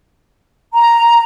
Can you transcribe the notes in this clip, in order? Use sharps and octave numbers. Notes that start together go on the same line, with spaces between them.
A#5